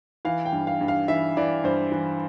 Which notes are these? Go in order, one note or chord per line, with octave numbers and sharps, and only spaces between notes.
E3 F5
G5
G2
F5
G2
F5
E3 E5
E3 D5
G2 C5
E3